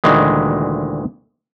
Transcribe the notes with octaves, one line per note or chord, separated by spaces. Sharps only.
D2 A#2 D#3 E3 G#3